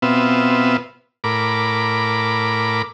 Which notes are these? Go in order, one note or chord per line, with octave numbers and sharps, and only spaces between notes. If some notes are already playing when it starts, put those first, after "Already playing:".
B2 B3 C4 F4 E5
A2 A#4 B5 D6